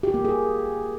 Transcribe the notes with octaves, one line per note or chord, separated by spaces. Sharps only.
G4
A#3
G#4